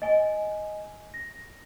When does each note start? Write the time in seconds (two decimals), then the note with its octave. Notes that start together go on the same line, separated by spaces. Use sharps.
0.02 D#5 G#5
1.14 A#6